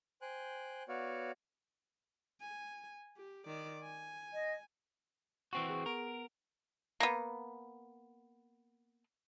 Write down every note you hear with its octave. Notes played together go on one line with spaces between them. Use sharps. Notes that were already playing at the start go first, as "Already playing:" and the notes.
C5 G5 G#5 F#6
B3 F#4 C#5 D5 F5
G#5
G4
D#3 D5
G#5
D#5
E3 C4 F#4 C#6
G#4
B3 A#4 D7
A#3 B3